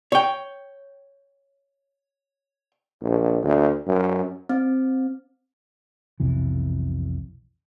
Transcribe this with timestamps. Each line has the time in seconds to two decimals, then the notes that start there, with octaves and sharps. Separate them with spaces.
0.12 C#5 G5
3.02 A#1
3.43 D2
3.87 F#2
4.49 C4
6.20 B1 F2 C3 E3